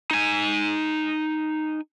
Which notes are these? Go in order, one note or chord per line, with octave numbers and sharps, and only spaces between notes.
D#4 G#5